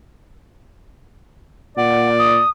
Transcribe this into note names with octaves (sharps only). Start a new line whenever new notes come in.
A#2 D5 F#5
D#6